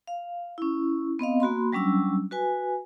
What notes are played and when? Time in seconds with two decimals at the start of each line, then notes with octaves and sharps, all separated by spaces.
0.07 F5
0.58 C#4 E4
1.19 B3 C4 D#5 F5
1.40 A#3 F#4 B5 C6
1.72 F#3 G3 C#4 D4 E6
2.31 F#4 B4 G#5